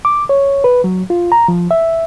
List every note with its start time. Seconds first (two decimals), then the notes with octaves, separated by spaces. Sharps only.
0.05 D6
0.29 C#5
0.64 B4
0.84 F#3
1.10 F4
1.32 A#5
1.48 F3
1.71 E5